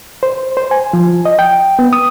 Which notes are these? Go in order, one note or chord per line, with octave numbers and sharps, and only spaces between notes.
C5
C5
G#5
F3
D#5
G5
B3
D#6